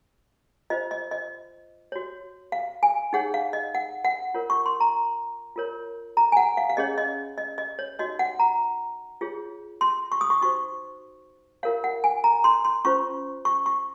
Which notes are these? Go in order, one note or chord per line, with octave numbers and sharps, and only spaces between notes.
F4 C5 D#5
D#5
D#5
F#4 C#5
F5
G#5
D#4 G#4 C#5 F#5
F5
D#5
F#5
F#5
F4 A#4 C#5
C#6
C6
A#5
F4 A#4 C#5
A#5
G#5
F#5
F5
F5
C#4 G#4 C#5 D#5
D#5
D#5
D#5
C#5
D#4 F#4 C#5 D#5
F#5
A#5
F4 G#4 C#5
C6
C#6
D#6
C#6
D#4 F#4 C5 C#6
F4 A#4 C#5 F5
F#5
G#5
A#5
C6
C6
C#4 F4 C5 C#6
C#6
C#6